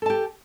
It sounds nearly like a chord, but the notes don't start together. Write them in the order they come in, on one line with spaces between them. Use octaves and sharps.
A4 A5 G4